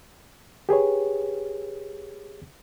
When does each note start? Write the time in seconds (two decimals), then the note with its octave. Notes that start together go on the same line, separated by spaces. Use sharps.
0.69 G4 G#4 B4 C#5